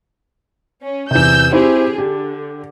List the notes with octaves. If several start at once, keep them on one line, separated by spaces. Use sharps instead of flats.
C#4
E2 C3 E6 G6
C4 E4 G4 G#4
D3 G4